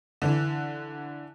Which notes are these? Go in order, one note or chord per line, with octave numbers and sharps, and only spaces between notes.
D3 E3